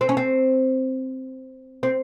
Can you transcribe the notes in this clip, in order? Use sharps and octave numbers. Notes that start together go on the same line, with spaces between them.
C4
C#4
C4
C4